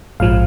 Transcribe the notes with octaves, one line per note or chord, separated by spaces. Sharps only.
A#1 G#2 F3 F5